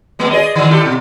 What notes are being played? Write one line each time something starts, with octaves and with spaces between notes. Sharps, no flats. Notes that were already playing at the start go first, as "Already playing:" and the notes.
G#3 A3 B3
G#4 D5 D#5
D#3 G#3
E4 G4 A4
B2